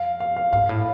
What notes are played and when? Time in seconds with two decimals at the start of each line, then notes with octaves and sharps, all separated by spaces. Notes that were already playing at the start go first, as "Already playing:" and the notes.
Already playing: F2 F5
0.20 F5
0.36 F5
0.53 G#2 F5
0.69 A2